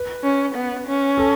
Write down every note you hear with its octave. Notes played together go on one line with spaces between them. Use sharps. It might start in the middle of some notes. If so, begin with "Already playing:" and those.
Already playing: B4
C#4
B3
C#4
A4